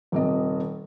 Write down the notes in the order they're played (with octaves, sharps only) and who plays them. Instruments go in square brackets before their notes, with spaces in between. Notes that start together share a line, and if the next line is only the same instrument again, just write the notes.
[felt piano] D#1 C3 D#5